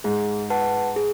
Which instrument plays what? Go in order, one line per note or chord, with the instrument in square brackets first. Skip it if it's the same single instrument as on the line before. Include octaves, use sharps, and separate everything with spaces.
[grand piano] G#2 [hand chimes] G#4
[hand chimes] B4 F#5 A5
G#4